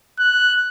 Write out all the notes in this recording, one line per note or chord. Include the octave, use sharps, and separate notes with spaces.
F#6